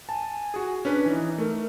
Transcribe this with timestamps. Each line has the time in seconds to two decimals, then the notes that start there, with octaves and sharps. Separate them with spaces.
0.09 G#5 A5
0.54 F#4 G#4
0.85 C#4 D4 B4
1.06 E3 D#4
1.38 A3 A#4